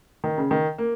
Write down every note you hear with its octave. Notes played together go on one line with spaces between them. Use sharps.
D#3
C#3
D#3
A#3